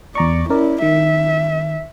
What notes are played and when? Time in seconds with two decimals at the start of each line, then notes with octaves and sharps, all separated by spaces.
0.15 E2 D5 A#5 C#6
0.50 C#4 E4 A#4 D5
0.82 D#3 E5